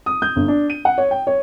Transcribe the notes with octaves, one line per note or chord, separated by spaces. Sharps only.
D#6
G6
G1
D4
D#7
F#5
C#5
G5
C#5